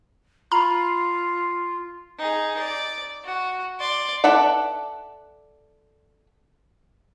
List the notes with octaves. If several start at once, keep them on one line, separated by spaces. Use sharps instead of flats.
F4 A#5 B5 F6
D#4 G#4
D5
F#4
D5 C6
A4 B4 D5 E5 F#5